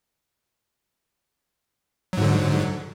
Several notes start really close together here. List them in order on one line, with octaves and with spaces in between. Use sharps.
F#3 G#2 D3